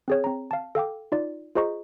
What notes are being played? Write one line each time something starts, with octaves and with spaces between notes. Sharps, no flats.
C4 G#4 C#5
C4 A#5
F5 A5
A4 F5 G5 D6
D#4 F4 D5
F4 G#4 C5 D#5 A#5 C#6